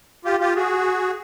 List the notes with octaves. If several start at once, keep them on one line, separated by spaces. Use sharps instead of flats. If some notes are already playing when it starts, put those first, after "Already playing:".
F4 G4
F4 G4
F#4 G#4